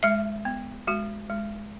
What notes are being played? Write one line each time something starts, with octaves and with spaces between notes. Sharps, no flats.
G#3 E5
B3
G#3 F#4
G#3